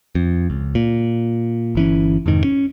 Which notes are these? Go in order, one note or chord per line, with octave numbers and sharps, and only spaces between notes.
F2
C#2
A#2
G1 E3 C#4
F2 G#2 C3 D#3
C#4